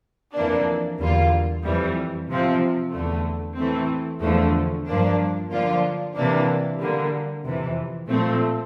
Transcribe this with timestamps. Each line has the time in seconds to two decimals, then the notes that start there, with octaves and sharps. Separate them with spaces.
0.34 F2 E3 A#3 D4
0.99 E2 D3 G3 A#3 F4
1.63 F2 E3 G3
2.28 C3 F3 C4
2.92 E2 D3 A3
3.57 E3 A3 C4
4.21 E2 D3 F3 A3
4.86 G2 F3 A#3 D4
5.51 D3 F3 A#3 D4 F4
6.15 C3 E3 A#3 D4
6.80 D3 G3 A#3
7.45 F2 C3 E3
8.09 A#2 F3 A3 C4